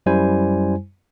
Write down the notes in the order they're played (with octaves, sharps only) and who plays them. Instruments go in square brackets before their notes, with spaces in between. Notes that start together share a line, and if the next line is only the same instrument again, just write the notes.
[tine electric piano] F#2 G3 E4 C5 G#5